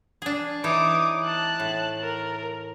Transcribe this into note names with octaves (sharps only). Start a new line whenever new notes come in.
D4 G#4
E3 D#4 C#5 D6 D#6
A5 F#6
A2
A#4